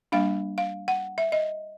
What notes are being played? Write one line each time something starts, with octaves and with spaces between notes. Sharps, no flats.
G3 A#3 D4 F5
F5
F#5
E5
D#5